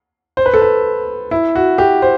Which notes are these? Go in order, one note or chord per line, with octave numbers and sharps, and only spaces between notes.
C5
B4
A4
B4
E4
F#4
G4
C5